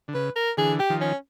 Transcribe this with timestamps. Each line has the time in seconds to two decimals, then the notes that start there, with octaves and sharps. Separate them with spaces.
0.08 D3
0.15 C#3 B4
0.36 A#4
0.57 D3 E3 G#4
0.80 G4
0.90 D#3 F3
1.01 C#4